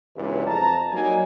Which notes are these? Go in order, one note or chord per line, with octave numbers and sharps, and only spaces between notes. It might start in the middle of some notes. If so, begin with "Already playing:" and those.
C#2 G2 B2 E3
F2 A5 A#5
F#3 G3 A#3 D#4 G#5